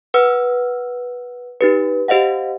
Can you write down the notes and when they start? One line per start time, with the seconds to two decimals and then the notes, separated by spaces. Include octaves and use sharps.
0.14 B4 F#5 E6 F6
1.61 D#4 G4 B4
2.08 G4 C5 D#5 F5 F#5